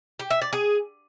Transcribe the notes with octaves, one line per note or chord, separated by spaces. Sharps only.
G4
E5
D5
G#4